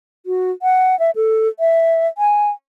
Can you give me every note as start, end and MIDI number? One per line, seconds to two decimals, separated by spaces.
0.26 0.51 66
0.62 0.98 78
0.99 1.11 76
1.16 1.48 69
1.60 2.07 76
2.18 2.50 80